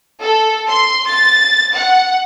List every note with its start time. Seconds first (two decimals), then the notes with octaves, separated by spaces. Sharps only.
0.22 A4
0.69 C6
1.09 A6
1.75 F#5